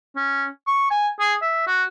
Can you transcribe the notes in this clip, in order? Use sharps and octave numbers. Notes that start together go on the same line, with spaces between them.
C#4
C#6
G#5
G#4
E5
F#4